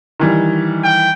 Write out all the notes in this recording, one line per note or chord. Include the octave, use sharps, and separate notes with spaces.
D#3 E3 G3
G5